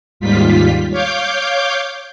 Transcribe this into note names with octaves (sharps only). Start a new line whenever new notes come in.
D#2 G#2 G3 F4 B6
C#5 F5 D6 G6